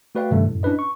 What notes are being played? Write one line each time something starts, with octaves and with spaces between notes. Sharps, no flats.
A3 F#4 B4 D5 F5 G5
G2 C3 D#3 G3 A3
F#2 A2
C#4 D4 E4 B4 D#5
C#6